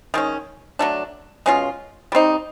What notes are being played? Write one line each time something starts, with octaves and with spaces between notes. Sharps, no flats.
D#3 G#3 C#4
F#3 A3 D4
B2 G#3 C#4 F4
G3 C4 D#4